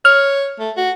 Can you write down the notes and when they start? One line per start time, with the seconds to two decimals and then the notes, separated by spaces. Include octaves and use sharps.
0.05 C#5 F6
0.59 A3
0.77 F#4